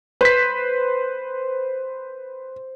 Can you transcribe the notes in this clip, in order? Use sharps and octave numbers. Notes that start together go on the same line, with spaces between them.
B4 C5 B6